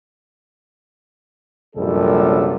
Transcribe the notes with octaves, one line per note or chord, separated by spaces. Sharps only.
A#1 F#2 C3 G3 G#4 A4